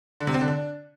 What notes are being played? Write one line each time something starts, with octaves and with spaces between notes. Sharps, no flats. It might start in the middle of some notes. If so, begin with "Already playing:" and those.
D3
C3
C4
D3
D4